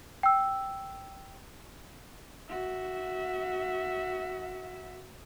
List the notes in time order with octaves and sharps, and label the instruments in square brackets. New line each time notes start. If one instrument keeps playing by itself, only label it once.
[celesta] G5 E6
[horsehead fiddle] F#4 E5